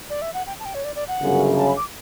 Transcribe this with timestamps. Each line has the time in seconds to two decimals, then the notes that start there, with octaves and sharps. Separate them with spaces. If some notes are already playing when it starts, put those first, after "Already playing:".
0.10 D5
0.22 E5
0.34 F#5
0.47 G5
0.60 A5
0.65 G5
0.75 C#5
0.84 D5
0.95 D5
1.08 F#5
1.21 G1 F#2 C#3
1.57 A5
1.67 B5
1.77 D6